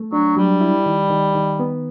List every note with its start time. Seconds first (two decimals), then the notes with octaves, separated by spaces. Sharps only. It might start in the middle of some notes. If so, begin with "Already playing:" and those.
Already playing: A3
0.12 F#3 D4
0.37 F#3 G3
0.61 E4
0.86 D#3
1.10 D#3
1.35 D#3
1.59 B3